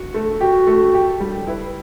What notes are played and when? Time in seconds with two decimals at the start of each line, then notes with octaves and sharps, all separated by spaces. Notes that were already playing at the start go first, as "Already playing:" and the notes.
Already playing: F#4
0.14 A3
0.41 F#4 G4
0.67 A3
0.94 G4
1.20 G3
1.47 E4 B4